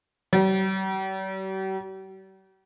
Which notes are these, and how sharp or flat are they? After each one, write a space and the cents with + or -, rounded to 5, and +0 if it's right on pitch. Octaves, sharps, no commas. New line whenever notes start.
G3 -45